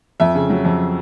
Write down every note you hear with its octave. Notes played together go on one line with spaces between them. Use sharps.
F2 E5
C#3
F#3
F2